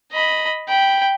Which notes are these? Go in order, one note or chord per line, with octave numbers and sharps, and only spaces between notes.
D#5 B5
G5 B5